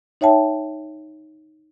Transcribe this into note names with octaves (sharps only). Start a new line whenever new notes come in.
D#4 C#5 E5 G5 A5